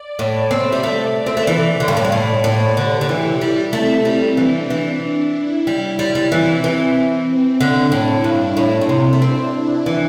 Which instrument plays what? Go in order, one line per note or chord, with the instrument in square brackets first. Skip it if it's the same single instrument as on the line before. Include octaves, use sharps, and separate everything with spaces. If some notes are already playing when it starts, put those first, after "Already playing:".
Already playing: [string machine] D5
[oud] A2
[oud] C4 [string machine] E5
[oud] G3
[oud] A3 [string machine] D5
[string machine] E5
[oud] C4
A3
[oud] E3 [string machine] D5
[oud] D3
G2
A2
G2
A2
[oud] A2 [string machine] C5
[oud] D3 [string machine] G4
[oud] D3
[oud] E3 [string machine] E4
[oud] G3
[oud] A3 [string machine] C4
[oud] G3
[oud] E3 [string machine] D4
[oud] E3
[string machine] E4
[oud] G3 [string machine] E4
[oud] G3 [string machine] E4
[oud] G3
[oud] E3 [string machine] C4
[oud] E3 [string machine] C4
[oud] D3 [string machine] D4
[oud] A2 [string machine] E4
[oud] G2 [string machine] D4
[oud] A2 [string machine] E4
[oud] A2
C3
A3
[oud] C4 [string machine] D4
[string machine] E4
[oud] E3